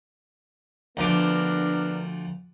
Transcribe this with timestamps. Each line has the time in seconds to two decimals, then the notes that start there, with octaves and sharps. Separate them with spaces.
0.97 D2 F3 B3 D4 A#4 D6